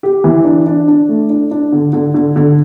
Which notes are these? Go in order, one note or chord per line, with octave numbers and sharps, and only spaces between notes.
G4
E3
D4
D4
D4
A3
D4
D4
D3
D3
D3
D3